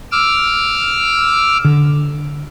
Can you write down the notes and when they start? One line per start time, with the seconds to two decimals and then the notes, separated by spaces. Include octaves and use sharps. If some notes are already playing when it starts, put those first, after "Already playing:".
0.12 D6 E6 F6
1.65 D3